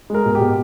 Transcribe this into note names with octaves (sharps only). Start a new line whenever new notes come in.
G#3 A#4
B2
G4
B2